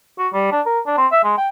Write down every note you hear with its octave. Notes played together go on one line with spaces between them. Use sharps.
F#4
G3
D4
A#4
D4
C4
E5
G#3
G5